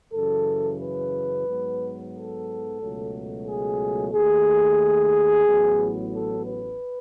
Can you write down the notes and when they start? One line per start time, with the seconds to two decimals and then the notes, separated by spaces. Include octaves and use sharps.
0.14 F#2 C#3 E3 A4
0.80 B4
1.47 G#2 F#3 B3
2.14 A4
2.80 C#2 B2 F#3 A3
3.47 G#4
4.13 D#2 D#3 A3 G#4
5.47 A1 A2 F#3 B3
6.13 A4
6.46 B4